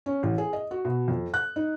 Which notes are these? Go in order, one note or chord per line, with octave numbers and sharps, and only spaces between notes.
C#4
A1
G#4
D#5
F#4
B2
F2
F#6
D#4